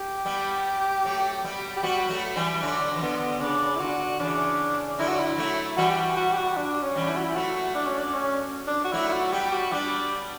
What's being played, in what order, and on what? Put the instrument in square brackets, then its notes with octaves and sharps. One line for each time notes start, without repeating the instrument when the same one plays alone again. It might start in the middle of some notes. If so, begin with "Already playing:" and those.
Already playing: [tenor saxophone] G4
[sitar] G3 B3
F#3 A3
G3 B3
[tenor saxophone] G4
[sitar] G3 B3 [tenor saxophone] F#4
[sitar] F#3 A3
E3 G3
[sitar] D3 F#3 [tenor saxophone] D4
[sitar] E3
[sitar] D3 [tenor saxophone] B3
[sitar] C#3 [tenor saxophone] D4
[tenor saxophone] E4
[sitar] D3 [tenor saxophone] F#4
[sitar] C#3 E3 [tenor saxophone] D4
[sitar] D3 F#3 [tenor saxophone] E4
[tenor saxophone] F#4
E4
[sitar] F#3 A3
[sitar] E3 G3 [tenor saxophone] F#4
[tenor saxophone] G4
F#4
F#4
G4
F#4
D4
C#4
[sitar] E3 G3
[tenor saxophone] E4
F#4
E4
[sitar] F#3 A3 [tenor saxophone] F#4
[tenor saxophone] D4
C#4
D4
C#4
D4
F#4
[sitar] F#3 A3 [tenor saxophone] E4
[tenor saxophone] E4
F#4
[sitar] G3 B3 [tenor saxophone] G4
[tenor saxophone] F#4
[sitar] G3 B3 [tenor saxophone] D4